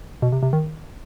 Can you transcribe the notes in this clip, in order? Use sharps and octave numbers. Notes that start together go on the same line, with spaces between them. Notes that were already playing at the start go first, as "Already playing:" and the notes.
B2
C3
C3
D#3